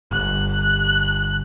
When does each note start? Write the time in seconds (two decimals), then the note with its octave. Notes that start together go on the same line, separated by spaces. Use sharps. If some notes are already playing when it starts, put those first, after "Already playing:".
0.11 G1 F#6